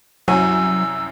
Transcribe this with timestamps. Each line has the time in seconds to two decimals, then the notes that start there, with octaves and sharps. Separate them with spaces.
0.28 C2 F#2 F#3 G#5 E6